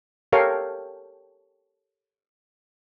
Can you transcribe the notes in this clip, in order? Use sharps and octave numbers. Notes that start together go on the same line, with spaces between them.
G4 A4 A#4 C#5 F5 G5